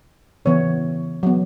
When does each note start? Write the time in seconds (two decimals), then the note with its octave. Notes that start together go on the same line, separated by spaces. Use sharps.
0.45 C#3 E3 B3 C#5
1.23 F#3 B3